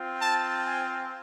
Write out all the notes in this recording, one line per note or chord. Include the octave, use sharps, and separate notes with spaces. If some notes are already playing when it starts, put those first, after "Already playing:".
Already playing: C4 F4
A5
G#5